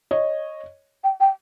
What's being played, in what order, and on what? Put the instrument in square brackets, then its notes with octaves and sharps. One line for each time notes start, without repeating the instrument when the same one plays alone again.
[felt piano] C#5 D#5
[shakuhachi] G5
G5